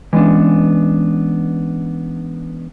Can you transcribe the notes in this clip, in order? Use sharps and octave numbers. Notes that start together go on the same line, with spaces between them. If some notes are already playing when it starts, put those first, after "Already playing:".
E3 G#3 B3 C#4 D4